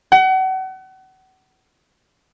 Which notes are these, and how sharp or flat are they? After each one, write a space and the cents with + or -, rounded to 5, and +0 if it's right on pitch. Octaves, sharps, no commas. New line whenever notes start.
F#5 +35